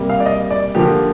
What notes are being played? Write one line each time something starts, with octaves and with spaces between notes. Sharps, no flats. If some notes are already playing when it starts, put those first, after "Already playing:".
Already playing: C3 G3 A#3
F5
D5
D#5
D5
D3 F3 A#3 G4